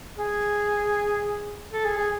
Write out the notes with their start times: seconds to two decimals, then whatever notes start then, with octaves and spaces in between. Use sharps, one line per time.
0.16 G#4
1.72 A4
1.85 G#4
1.98 G#4